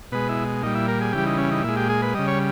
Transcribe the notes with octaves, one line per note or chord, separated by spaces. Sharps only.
B2 G#3 B4
E4
A#2 G3 D#4
E4
A#4
G#4
C#3 E3 G3 G4
D#4
C#4
D#4
A#2 G#3 E4
G4
G#4
B4
C#3 G3 D#5
C#5